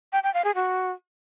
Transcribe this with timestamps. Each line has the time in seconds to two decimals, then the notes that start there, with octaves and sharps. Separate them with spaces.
0.13 G5
0.23 G5
0.34 F5
0.45 G#4
0.55 F#4